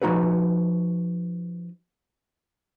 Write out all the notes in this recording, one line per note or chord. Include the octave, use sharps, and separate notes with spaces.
F3 G#3 D#4 F#4 G#4 B4